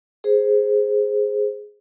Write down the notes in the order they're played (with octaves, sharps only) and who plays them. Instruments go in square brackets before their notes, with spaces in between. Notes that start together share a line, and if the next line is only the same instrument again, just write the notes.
[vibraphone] G#4 C5